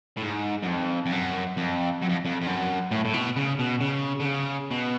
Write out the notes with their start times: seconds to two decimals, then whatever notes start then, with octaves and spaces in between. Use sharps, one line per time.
0.17 A2
0.22 G#2
0.62 F#2
0.67 F2
1.06 F2
1.12 F#2
1.57 F2
2.02 F#2
2.09 F2
2.25 F2
2.41 F2
2.47 F#2
2.91 A2
3.05 A2
3.14 B2
3.36 C#3
3.59 B2
3.81 C#3
4.20 D3
4.25 C#3
4.71 B2